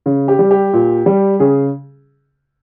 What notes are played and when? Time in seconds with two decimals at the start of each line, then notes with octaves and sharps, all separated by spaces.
0.06 C#3
0.28 G4
0.39 G3
0.51 G4
0.73 A#2
1.06 G3
1.40 C#3 G#4